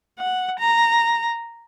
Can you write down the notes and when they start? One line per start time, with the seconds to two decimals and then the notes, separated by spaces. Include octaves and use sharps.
0.19 F#5
0.59 A#5